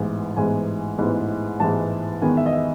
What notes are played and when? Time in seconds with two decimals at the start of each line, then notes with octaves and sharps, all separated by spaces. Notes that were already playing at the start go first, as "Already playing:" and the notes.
Already playing: A1 G#2 E3 G#3 B3
0.36 A1 G#2 E3 G#3 B3 G#5
0.98 A1 G#2 E3 G#3 B3
1.60 A1 G#2 E3 G#3 B3 A5
2.22 E2 D#3 G#3 B3 G#5
2.37 E5
2.46 D#5
2.53 E5